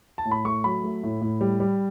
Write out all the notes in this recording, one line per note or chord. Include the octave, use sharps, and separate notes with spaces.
A5
A2
B5
A3 C#6
F#3 B5
A3
A2
A2
G3
G3